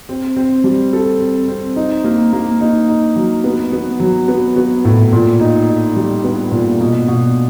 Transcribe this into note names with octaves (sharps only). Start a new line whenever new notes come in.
C4
C4
G3
A4
C4
C4
D#4
A#3
A#3
D#4
D#4
F#3
B3
B3
F#3
B3
B3
A2
A#2
D#4
D#4
G3
B3
A#2
B2
B2